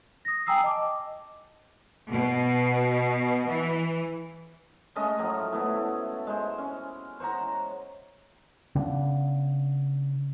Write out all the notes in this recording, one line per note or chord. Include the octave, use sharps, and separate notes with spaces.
D#6 A#6
G5 G#5 A#5 D#6 E6 C7
D#5 A5 D6
B2
E3
G#3 A3 C#4 D#5
A2 F3 F#3
A3 B3 E4
G#3 C5
C#4
C5 C#5 F#5 A#5
C#3 B3 D4